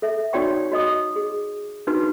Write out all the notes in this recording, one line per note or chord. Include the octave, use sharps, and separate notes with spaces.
A4 E5
D#4 F#4 C#5 D5 G5 C#6
F#4 D#5 D#6
G#4
D4 D#4 F#4 B4